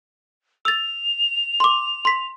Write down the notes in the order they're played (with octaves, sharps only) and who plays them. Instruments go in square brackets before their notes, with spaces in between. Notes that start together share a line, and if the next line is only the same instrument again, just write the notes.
[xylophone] E6 A6 [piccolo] F7
[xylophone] C6 D6
C6 B6